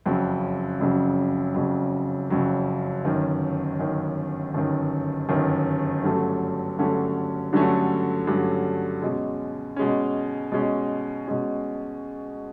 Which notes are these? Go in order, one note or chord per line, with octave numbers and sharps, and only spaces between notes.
F#1 F2 C#3 F#3
F#1 F2 C#3 F#3
F#1 F2 C#3 F#3
F#1 F2 C#3 F#3
G1 F#2 D#3
G1 F#2 D#3
G1 F#2 D#3
G1 F#2 D#3
G2 D3 F#3 A3 C#4
G2 D3 F#3 A3 C#4
G2 D3 F#3 A3 C#4
G2 D3 F#3 A3 C#4
B2 G#3 C#4
B2 G#3 C#4
B2 G#3 C#4
B2 G#3 C#4